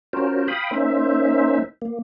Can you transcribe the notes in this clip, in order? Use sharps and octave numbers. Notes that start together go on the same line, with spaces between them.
C#4 F4 F#4 A#4 C5
F5 G5 B5 D#6
A#3 C#4 D#4 C5 E5
A#3